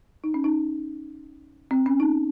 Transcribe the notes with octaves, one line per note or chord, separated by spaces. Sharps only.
D#4
C#4
D#4
C4
C#4
D#4